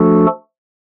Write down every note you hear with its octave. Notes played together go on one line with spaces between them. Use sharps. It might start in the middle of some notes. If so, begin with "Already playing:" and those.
Already playing: F3 A3 D4 F#4 A4